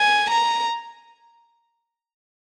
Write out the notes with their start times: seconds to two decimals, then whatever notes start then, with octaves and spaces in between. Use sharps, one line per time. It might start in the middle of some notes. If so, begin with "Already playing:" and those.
Already playing: G#5
0.31 A#5